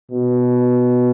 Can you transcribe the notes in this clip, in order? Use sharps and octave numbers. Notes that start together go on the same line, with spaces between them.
B2